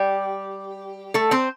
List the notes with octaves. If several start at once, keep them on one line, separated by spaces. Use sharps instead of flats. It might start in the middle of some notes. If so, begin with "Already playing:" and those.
Already playing: G3 G4
A3 A4
C4 C5